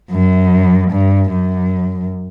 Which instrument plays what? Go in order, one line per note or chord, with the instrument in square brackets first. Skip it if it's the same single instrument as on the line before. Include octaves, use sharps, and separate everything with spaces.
[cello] F#2
G2
F#2